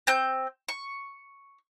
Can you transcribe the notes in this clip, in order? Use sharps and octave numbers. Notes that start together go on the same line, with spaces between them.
C4 G6
C#6